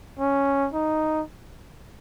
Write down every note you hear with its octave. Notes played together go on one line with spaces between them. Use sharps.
C#4
D#4